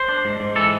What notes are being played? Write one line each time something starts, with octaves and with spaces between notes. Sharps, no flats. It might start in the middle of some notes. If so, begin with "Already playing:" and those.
Already playing: C5
D4
G#2
G#2
E3 A4